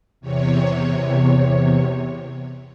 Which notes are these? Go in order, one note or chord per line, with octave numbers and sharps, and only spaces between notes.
E2 C3 C#5